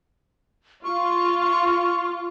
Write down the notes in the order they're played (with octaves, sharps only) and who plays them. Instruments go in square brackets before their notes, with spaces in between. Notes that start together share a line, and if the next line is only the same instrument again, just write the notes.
[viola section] F4 [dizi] C#6